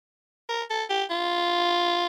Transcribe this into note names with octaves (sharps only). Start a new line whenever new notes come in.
A#4
A4
G4
F4